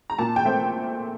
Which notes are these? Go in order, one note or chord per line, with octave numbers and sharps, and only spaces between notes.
A#5
A#2 A5
G5
A3 C4